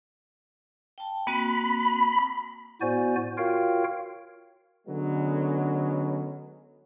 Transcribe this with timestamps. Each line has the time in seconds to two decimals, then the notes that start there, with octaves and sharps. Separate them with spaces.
0.98 G5 A5
1.27 A#3 C4 F#4 B5
2.81 A2 B3 F#4 C5 D5 G#5
3.38 F4 F#4 A#4 C#5 F5 G5
4.87 D3 F#3 G#3 B3 C#4